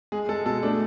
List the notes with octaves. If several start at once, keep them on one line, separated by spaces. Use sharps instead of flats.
G#3 G#4
G#3 A4
B2 A4
A3 D4